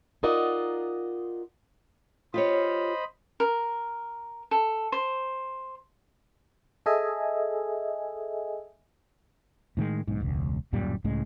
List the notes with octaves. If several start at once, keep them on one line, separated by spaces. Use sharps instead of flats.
D#4 F4 A#4 D5 D#5 F#5
F4 G4 C5 C#5 D#5 B5
A#4
A4
C5
G#4 A4 D#5 E5 G#5
A2 D#3 F3 G#3
B1 G#2
E1 C#2
D1 F#2 A#2 G3
C#2 A2 C#3 G#3